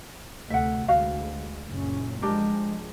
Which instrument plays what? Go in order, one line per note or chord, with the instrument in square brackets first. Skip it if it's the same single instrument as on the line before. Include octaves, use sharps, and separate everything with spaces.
[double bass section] D2 C3 A3 [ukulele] E5 F#5
[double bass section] D2 G#3 [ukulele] F#4 F5
[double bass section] F#1 A#2 C#4
[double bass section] F3 G#3 [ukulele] D4 G4 A#4